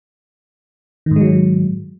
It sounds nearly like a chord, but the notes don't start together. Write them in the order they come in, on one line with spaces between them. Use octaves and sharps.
D#3 G#2 G#3 F#3